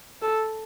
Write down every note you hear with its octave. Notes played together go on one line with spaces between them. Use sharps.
A4